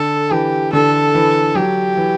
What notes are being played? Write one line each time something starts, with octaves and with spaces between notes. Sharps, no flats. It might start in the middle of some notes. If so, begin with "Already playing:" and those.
Already playing: D3 A4
E3 G4
D3 A4
E3
F#3 G4
E3